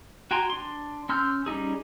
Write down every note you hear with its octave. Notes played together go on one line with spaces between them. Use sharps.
F#4 G5 G#5 A#5 C6
D4 C6
C#4 C6 E6 F6 G6
G3 C#4 D#4 G#4